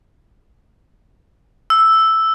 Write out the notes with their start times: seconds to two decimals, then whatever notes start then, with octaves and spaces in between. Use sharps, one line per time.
1.70 E6